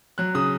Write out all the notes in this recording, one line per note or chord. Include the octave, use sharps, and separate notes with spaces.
F#3 F#6
C#3 D#6